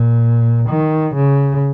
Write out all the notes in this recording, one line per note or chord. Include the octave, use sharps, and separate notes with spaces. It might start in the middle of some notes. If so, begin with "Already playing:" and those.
Already playing: A#2
D#3
C#3